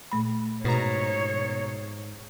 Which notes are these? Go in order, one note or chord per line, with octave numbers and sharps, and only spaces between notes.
A#2 A3 B5
G#2 B2 C#5 A#5